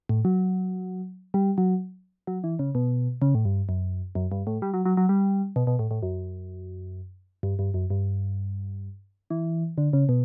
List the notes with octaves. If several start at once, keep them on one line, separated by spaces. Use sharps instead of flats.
A2
F#3
G3
F#3
F#3
E3
C#3
B2
C#3
A2
G2
F#2
F#2
G2
A2
G3
F#3
F#3
F#3
G3
B2
B2
A2
A2
F#2
G2
G2
F#2
G2
E3
D3
C#3
B2